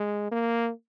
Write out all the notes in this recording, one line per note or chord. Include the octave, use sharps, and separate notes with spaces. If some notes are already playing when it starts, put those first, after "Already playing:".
Already playing: G#3
A#3